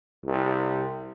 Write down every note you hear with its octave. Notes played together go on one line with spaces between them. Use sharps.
C2